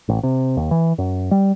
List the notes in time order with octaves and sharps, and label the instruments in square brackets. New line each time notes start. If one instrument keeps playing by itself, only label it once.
[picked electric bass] A1
C3
D#2
E3
F#2
G3